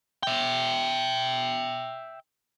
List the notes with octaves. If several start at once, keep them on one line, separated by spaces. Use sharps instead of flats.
E5 G5